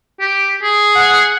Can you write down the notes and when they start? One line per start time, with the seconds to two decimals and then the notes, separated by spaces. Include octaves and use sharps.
0.20 G4
0.63 G#4
0.96 F#5